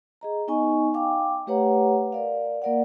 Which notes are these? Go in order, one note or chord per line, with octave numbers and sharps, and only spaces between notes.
G#4 D#5 A#5
B3 D#4 D#5 G#5 C#6
F5 G5 D6
A3 G4 B4 C#5 F#5 A#5
A#4 D5 F5
A#3 A#4 D5 F5 F#5